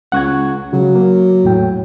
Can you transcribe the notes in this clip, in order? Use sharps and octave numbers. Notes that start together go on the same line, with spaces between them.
C#2 F#5 C#6 G#6
C#3 F#3
A#3
E2 A2 G5